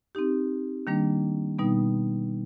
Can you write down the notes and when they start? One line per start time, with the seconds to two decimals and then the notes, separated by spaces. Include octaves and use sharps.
0.15 C4 D#4 G4
0.87 D#3 G3 A#3 D4
1.59 B2 G3 B3 D#4